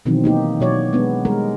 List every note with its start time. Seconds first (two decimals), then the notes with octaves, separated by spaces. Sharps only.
0.06 B2 D#3 E3 F#3 C4
0.24 A#3 D#4 G4
0.60 B2 F#3 C#5 D5
0.93 G#3 B3 D4
1.25 G3 G#3 A#4